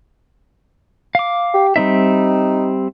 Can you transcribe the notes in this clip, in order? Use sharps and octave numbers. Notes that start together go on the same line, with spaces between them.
F5 D6
G4
G3 C4 D#4 E5